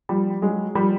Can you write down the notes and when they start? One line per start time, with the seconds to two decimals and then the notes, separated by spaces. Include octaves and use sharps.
0.09 F3 G3
0.42 F#3 G#3
0.75 F3 G3